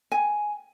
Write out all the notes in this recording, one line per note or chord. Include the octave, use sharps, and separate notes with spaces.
G#5